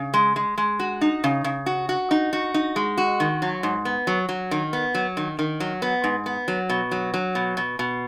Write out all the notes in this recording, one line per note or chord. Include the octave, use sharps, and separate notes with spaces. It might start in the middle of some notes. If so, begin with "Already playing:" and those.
Already playing: C#3
G#3
G#3
G#3
F#4
D#4
C#3
C#3
F#4
F#4
D#4
F#4
D#4
G#3
F#4
D#3
F#3
G#2
B3
F#3
F#3
D#3
B3
F#3
D#3
D#3
F#3
B3
G#2
B3
F#3
B2
F#3
F#3
B2
B2
B2